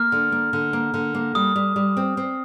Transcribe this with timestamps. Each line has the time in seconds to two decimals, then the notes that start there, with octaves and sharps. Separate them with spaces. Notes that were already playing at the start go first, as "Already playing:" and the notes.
Already playing: A#3 F6
0.12 D3
0.32 A#3
0.53 D3
0.73 A#3
0.94 D3
1.15 A#3
1.35 G3 D#6
1.56 G3
1.76 G3
1.97 C4
2.17 C4